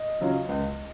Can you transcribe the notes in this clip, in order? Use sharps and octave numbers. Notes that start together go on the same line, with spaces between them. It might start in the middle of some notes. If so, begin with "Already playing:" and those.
Already playing: D#5
C#3 F#3 C#4 F4
C#2